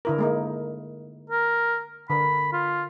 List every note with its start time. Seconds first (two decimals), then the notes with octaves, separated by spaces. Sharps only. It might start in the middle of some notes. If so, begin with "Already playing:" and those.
0.05 D3 E4 A#4
0.18 G#3 A#3 D#4
1.30 A#4
2.10 D3 A#4 B5
2.53 F4